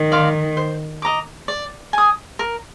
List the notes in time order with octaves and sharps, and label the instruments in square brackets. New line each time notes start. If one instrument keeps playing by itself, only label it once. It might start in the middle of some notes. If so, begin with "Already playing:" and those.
Already playing: [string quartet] D#3
[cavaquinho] D5 F5 C6
C5
D#5 A#5 D6
D5
G#5 D#6
A#4